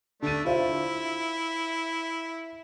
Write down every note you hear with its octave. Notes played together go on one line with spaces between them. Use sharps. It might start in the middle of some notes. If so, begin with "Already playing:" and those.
D3 A3 D4 D#7
E4 F4 C5 E5